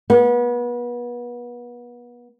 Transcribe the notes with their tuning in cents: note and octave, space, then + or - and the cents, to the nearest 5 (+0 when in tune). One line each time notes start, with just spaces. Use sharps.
B3 -30